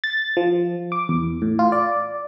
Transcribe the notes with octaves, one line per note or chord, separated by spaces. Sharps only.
A6
F3
D6
E2
A2
F4
D5